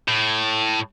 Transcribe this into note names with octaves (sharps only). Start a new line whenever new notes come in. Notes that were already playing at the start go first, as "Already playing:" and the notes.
A2